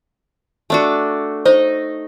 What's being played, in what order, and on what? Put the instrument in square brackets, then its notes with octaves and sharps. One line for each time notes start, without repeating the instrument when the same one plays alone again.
[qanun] A3 D4 F#4
[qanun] D#4 D#5 [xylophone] C5